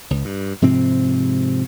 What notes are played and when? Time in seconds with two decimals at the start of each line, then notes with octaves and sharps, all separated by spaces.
0.10 C#2
0.25 G2
0.62 G#2 C3 F3 C4